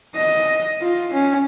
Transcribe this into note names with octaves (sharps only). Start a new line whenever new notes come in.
D#5
F4
C#4